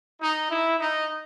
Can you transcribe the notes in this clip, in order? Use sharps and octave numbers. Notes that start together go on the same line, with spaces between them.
D#4
E4
D#4